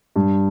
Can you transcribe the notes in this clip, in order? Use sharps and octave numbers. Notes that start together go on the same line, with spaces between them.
G2